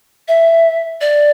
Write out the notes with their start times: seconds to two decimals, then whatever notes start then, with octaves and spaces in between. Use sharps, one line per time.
0.28 E5
1.01 D5